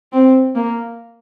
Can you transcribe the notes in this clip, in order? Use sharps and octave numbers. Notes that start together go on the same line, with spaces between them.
C4
A#3